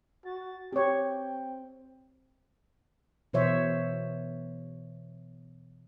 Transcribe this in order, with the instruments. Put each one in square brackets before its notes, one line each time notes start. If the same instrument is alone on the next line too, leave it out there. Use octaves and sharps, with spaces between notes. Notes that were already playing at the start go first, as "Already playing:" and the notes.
[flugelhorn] F#4 [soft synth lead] A6
[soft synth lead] C4 [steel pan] G4 C#5 [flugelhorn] G5
[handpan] B2 E3 C5 C#5 E5